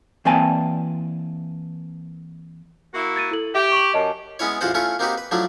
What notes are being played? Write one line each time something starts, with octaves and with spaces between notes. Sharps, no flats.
E3 A#3 C4 D5 G#5 A5
A#3 E4 F#4
G#6 A6 D#7
E4 A4 F#7
G4 E5
C#6 D6 F#7
F#2 D#5 A5
G#3 B3 C#4 E4 C#5
A1 E2 F4 F#4 C5 F#5
A3 C#4 E4 F4 C#6
A#3 C4 D#4 F#4 G4 B4
B4
F3 F#3 A3 D4 E4